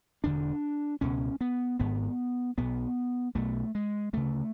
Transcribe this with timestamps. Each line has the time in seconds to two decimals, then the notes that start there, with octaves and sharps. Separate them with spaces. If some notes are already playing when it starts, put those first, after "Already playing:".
0.24 E1 E2 D3 D4
1.01 C#2 B2 C#4
1.41 B3
1.79 G#1 G#2 B3
2.58 B1 B2 B3
3.35 B1 B2 A3
3.75 G#3
4.13 D2 C#3 A3